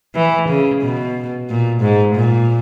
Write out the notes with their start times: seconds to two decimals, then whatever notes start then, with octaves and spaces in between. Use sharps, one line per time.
0.15 E3
0.49 C#3
0.81 B2
1.49 A#2
1.81 G#2
2.15 A#2